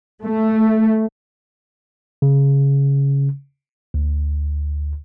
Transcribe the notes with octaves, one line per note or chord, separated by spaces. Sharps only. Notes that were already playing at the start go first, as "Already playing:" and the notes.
A3
C#3
D2